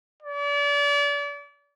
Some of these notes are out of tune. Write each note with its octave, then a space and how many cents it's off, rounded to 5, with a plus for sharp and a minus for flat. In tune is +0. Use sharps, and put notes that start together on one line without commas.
D5 -35